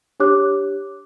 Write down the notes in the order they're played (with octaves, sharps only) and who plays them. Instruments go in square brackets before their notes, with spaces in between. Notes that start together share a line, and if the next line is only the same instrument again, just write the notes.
[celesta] D4 G4 C#5 D6 F#6